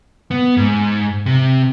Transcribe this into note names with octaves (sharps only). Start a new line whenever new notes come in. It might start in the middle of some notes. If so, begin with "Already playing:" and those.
B3
G#2
C3